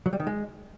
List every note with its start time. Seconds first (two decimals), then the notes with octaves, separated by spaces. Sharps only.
0.06 F#3
0.13 G3
0.20 D#3
0.27 G#3